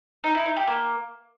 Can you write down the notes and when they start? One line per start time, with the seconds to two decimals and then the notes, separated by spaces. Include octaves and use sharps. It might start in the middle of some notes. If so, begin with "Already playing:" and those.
0.24 D#4
0.35 E4
0.46 D#4
0.56 G4
0.67 A#3